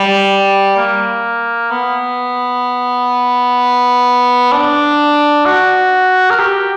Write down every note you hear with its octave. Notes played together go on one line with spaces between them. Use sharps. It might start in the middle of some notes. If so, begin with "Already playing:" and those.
Already playing: G3
A#3
B3
D4
F#4
A#4
G4